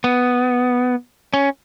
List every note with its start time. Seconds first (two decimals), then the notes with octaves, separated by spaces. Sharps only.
0.04 B3
1.34 C#4